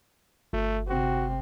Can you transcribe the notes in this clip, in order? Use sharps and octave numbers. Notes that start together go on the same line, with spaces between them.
G1 A3
C3 C4 F#4